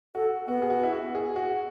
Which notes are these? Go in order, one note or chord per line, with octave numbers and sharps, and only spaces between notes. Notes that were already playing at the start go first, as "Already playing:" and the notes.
F#4 A4
B3 F#4
G#4
F#4
E4
F#4
G#4
F#4